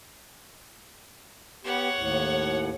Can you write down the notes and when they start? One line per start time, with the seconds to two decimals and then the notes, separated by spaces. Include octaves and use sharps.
1.64 B3 G4 C#5 F#5
1.96 D#2 A2